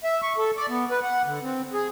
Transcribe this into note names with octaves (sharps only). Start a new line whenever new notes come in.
E5
C#6
A4
D5
B3
B4
F#5
D3
C4
G#4